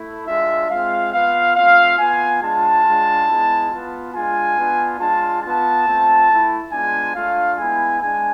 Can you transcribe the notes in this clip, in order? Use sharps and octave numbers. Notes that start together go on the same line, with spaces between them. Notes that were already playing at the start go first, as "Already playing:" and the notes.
Already playing: A3 E4
G#3 D4 F4 E5
G#3 C4 F4 F5
B3 F4 F5
A3 C4 F4 F5
B3 F4 G#5
G#3 D4 F4 A5
G#3 D4 F4
G#3 B3 E4
B3 F4
G#3 D4 F4 G#5
B3 D4 F4
G#3 D4 F4 A5
B3 F4 A5
A3 C4 F4
A3 E4
G#3 B3 D4 F4 G#5
A3 D4 F4 F5
G#3 B3 E4 G#5
G#3 D4 G#5